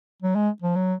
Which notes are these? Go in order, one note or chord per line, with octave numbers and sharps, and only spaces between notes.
F#3
G#3
F3
F#3